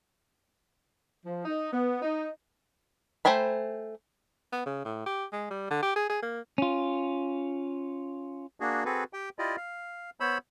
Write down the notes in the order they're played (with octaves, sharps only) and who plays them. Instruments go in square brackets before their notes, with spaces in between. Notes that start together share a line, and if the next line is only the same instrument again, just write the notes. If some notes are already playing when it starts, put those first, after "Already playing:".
[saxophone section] F3
D#4
B3
D#4
[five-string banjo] A3 C5 G5 G#5 B5
[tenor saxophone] B3
C#3
A2
G4
G#3
G3
D3
G4
G#4
G#4
A#3
[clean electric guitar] C#4 F4
[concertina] A#3 D4 F#4 G#4
C4 F#4 G#4 A4 B4
G4 G5
E4 F4 G4 D5 D#5
F5
B3 C5 C#5 B5 E6